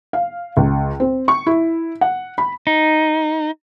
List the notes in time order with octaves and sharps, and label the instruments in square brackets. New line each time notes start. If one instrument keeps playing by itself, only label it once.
[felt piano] F5
C#2
C4
C#6
E4
F#5
B5
[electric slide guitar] D#4